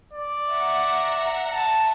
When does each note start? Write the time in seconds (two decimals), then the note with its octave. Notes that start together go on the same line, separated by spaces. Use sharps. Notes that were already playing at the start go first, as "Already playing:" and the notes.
0.13 D5
0.50 E5 F#5 A#5
1.53 A5